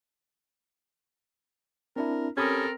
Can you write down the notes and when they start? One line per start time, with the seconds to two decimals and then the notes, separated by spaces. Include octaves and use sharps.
1.96 C4 D4 E4 A#4
2.37 C4 C#4 G4 A4 A#4 B5 D#6